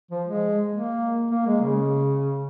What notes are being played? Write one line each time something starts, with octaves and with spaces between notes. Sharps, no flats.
F3
G#3
A#3
A#3
G#3
C#3